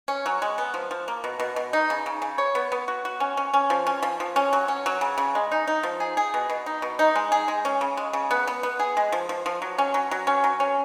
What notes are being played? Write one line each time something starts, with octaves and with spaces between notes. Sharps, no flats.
C#4
F#3
G#3
B3
F3
F3
A#3
B2
B2
B2
D#4
C#3
C#3
C#3
C#5
B3
B3
F#4
F#4
C#4
C#4
C#4
F3
C#4
F3
F3
C#4
F#3
C#4
F#3
C#3
C#3
G#3
D#4
D#4
F3
G#4
G#4
B2
B2
D#4
B2
D#4
G#3
G#4
G#3
C#4
C#3
G#3
C#3
B3
B3
B3
G#4
G#3
F3
F3
F3
F#3
C#4
F#3
F#3
C#4
F#3
C#4